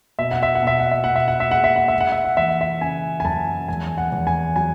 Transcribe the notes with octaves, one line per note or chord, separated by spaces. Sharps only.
B2 E5
F#5
E5
F#5
B2 E5
F#5
E5
B2 F#5
E5
F#5
E5
G#3 F#5
E5
F#5
E5
G#3
F#5
E5
F#5
E3 E5
F#5
E5
C#3 G#5
G#5
F#2 A5
E2 G#5
F#5
E2
G#5
F#3 G#5